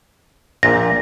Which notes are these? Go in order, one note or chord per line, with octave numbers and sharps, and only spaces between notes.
A#1 A#2 A#6